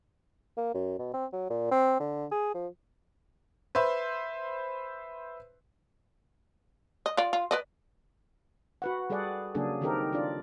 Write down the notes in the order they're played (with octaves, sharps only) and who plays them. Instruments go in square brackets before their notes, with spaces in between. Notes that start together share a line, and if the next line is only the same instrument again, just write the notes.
[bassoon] A#3
F#2
B2
C4
F#3
A#2
C4
D3
G#4
F3
[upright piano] B4 C5 E5 C6
[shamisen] D#5
F4 D5
F4
B4 D5 D#5
[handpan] F#4 B4 F#5
G3 G#4 A4 D5 F#5
C#3 F#3 A#3 D4 G#4 A4
D#3 C4 D#4 G4 A4 A#4
D4 F4 D5